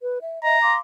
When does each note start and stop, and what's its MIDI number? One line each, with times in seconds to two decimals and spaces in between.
0.01 0.19 71
0.21 0.38 76
0.44 0.57 75
0.44 0.57 76
0.44 0.74 82
0.63 0.78 77
0.63 0.78 84
0.63 0.78 86